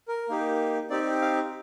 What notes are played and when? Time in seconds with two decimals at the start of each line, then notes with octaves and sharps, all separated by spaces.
0.08 A#4
0.29 A#3 D#4 G4
0.90 C4 D#4 G4 D5
1.22 F5